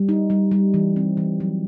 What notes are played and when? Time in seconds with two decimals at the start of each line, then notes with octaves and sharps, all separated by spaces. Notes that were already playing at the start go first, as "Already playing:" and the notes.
Already playing: G3
0.09 D#4
0.30 G3
0.51 G3
0.74 E3
0.96 C4
1.17 E3
1.40 F#3